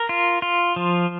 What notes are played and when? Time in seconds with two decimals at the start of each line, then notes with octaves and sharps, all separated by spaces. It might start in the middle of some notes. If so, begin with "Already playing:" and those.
Already playing: A#4
0.09 F4
0.42 F4
0.76 F3